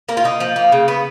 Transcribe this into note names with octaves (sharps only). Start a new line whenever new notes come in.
A#3 A#4
F4
A#3 D#4
F3
A#3
C#3
B3